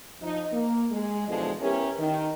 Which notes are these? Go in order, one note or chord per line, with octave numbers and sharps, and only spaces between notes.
F3 D#4
A#3
G#3
E2 B2 D3 F3 G#3
B3 C#4 E4 G4 A#4
D#3